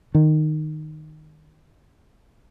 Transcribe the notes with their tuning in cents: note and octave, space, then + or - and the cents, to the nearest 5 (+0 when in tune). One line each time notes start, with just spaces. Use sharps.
D#3 -15